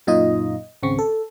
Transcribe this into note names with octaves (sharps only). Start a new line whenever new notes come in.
F#2 A#2 D#4 F4 D#5
G#1 C#2 C#3 C4 C#6
A4